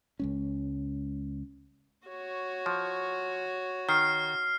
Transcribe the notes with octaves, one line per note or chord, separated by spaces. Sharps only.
C#2 G#3 C#4
F#4 C#5
F3
D#3 F6 C7